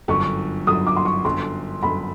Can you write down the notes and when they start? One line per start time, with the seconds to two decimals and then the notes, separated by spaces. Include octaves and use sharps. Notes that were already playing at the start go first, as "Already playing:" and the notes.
0.08 G1 F#2 D3 C#6
0.67 G1 F#2 D3 D#6
0.87 D6
0.97 C6
1.05 C#6
1.25 G1 F#2 D3 C6
1.83 G1 F#2 D3 B5